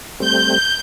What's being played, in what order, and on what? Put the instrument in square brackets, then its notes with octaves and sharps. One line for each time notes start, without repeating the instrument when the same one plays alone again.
[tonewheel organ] G3 A3 C4 [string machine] G6